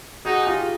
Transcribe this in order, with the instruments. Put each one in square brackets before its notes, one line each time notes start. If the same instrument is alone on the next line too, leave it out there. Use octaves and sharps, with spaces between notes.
[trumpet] D#4 [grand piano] F#4 G#4
[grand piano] F4 G4